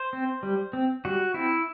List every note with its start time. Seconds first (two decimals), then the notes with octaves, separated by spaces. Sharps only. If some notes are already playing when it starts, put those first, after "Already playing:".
Already playing: C5
0.13 C4
0.43 G3
0.73 C4
1.05 G3 F#4
1.34 C4 E4